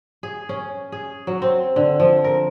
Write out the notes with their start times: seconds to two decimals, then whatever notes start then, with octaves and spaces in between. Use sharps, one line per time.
0.23 G#4
0.49 C#4
0.92 G#4
1.27 F#3
1.42 C4
1.76 D3
2.00 F3
2.24 A#4